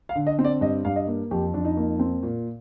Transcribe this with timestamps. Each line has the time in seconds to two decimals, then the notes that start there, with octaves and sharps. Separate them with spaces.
0.09 F5
0.15 D3
0.27 D#5
0.39 C4
0.45 D5
0.61 G2 D#5
0.85 G2 F5
0.96 D#5
1.07 A#3
1.31 F2 G4
1.54 F2 D4
1.65 D#4
1.77 A#3
1.99 C4
2.23 A#2